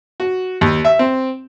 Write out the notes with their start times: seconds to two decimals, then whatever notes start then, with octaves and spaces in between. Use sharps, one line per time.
0.20 F#4
0.61 D#2
0.85 E5
0.99 C4